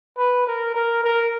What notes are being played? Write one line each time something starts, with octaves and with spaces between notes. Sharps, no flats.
B4
A#4
A#4
A#4